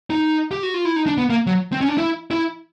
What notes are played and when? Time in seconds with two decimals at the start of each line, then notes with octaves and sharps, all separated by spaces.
0.10 D#4
0.51 G4
0.63 F#4
0.74 F4
0.85 E4
0.96 D#4
1.06 D4
1.18 B3
1.30 A#3
1.47 F#3
1.72 C4
1.81 C#4
1.89 D4
1.98 E4
2.31 E4